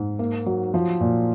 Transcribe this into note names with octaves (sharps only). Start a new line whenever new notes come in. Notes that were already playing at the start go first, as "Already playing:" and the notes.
Already playing: G#2
A#3
F#3
F3
A#2